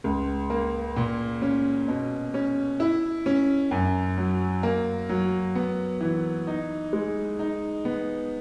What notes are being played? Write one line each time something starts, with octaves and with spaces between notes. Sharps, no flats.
C#2
A#3
A#2
C#4
B2
C#4
E4
C#4
F#2
F#3
A#3
F#3
B3
E3
D#4
G#3
D#4
B3